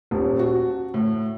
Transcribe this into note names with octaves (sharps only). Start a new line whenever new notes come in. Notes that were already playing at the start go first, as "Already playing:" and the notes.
D#1
F#4
A2